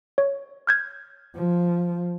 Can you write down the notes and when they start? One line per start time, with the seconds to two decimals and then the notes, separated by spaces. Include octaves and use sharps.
0.18 C#5
0.67 F6 G6 G#6
1.36 F3